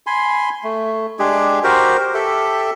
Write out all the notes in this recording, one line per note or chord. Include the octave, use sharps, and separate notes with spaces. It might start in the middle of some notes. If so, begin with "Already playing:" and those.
G#5 B5 C6
A3
G#3 D4 G4 G#4
F#4 G4 A#4 C5
G4 A4 E5